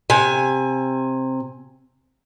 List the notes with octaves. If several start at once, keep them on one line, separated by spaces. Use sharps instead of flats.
C3 G#5